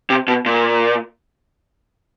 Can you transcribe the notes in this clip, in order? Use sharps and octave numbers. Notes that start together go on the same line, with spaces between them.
C3
B2
A#2